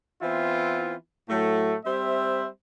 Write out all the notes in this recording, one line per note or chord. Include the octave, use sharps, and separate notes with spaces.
E3 B3 C4 E4 F4
A2 F#3 A3
G3 C4 C5 E5